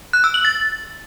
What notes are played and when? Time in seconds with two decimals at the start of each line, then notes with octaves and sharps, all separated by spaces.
0.13 F#6
0.24 E6
0.34 F#7
0.45 A6